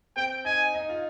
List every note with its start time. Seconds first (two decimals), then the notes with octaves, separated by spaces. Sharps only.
0.16 C4 G5
0.45 D#4 G#5
0.74 D#4
0.89 F4